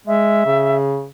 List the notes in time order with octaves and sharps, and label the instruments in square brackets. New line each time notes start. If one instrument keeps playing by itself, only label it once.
[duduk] G#3 [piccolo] E5
[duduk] C#3